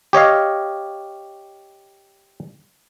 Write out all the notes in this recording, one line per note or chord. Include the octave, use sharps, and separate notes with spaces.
G4 C#5 D#5 F5